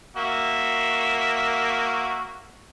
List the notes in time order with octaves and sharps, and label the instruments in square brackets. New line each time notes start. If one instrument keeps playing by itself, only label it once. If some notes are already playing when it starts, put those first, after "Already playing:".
[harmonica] A#3 F#4 E5